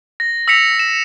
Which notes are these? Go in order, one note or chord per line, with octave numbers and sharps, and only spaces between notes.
A#6
E6 A#6 B6 C#7 F7
E7